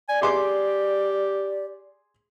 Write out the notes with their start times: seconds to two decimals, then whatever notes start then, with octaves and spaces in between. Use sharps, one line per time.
0.09 D5 G#5
0.22 G4 G#4 C6 D6